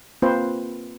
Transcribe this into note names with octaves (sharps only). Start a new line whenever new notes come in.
A#3 C4 F4 B4 C5